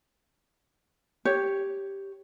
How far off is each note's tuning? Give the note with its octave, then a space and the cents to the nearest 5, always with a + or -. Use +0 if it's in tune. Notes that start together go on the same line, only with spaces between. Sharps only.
G4 +0 C#5 +0